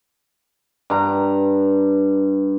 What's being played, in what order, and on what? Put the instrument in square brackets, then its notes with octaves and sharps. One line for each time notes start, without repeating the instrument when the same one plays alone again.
[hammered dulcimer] G2 A#5